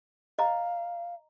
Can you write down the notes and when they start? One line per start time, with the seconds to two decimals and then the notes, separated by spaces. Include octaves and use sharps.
0.39 D#5 F5 A#5